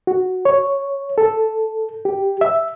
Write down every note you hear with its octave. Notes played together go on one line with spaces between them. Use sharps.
F#4
C#5
A4
G4
E5